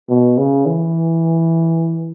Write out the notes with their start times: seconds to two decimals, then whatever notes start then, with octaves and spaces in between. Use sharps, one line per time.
0.09 B2
0.38 C#3
0.66 E3